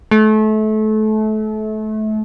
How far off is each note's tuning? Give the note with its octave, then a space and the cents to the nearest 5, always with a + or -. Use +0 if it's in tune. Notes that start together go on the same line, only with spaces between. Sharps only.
A3 -30